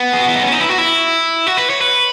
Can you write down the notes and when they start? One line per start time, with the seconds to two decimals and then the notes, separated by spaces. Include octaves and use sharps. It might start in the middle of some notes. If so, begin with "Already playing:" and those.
Already playing: B3
0.13 G#4
0.20 F#4
0.28 E4
0.36 D#4
0.43 C#4
0.52 D#4
0.61 E4
0.69 F#4
0.78 E4
1.47 F#4
1.57 B4
1.70 C#5
1.81 B4